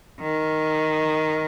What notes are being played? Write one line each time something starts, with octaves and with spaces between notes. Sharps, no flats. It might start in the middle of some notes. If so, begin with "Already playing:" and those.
D#3